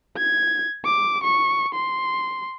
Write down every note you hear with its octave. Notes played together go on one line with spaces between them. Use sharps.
G#6
D6
C#6
C6